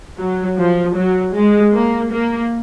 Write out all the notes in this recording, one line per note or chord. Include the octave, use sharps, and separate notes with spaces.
F#3
F3
F#3
G#3
A#3
A#3